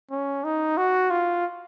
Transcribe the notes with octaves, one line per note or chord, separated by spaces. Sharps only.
C#4
D#4
F#4
F4